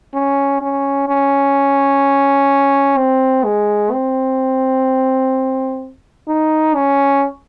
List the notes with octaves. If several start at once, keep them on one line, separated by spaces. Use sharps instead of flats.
C#4
C#4
C#4
C4
G#3
C4
D#4
C#4